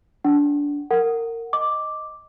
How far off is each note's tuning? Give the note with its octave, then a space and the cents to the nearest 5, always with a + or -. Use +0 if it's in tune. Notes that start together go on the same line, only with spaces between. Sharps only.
D4 -20 F#5 +20
A#4 -20 F#5 +0
D#5 +0 D6 +0